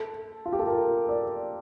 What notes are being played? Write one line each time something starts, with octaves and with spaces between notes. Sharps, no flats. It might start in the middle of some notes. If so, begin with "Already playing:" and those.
Already playing: A4
F4
G4
A4
A#4
D5